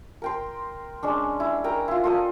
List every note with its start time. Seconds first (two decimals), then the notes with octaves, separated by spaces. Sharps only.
0.22 A#4 G5 C6
1.03 G#3 C#4 D4
1.40 E4
1.64 A#4 G5 A#5
1.88 E4 F4
2.04 F4 A4 D#5